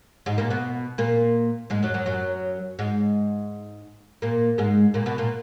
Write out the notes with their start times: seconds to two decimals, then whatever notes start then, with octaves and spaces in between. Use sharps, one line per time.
0.26 G#2 G#3
0.38 A#2 A#3
0.50 B2 B3
0.98 A#2 A#3
1.70 G#2 G#3
1.83 F#2 F#3
1.94 F#2 F#3
2.06 F#2 F#3
2.79 G#2 G#3
4.22 A#2 A#3
4.58 G#2 G#3
4.94 A#2 A#3
5.06 B2 B3
5.18 A#2 A#3